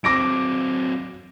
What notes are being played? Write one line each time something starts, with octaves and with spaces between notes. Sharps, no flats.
F#3 C4 D6 A#6 D7